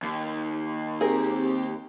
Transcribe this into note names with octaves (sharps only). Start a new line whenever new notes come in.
D#2
C4 G4 G#4 A#4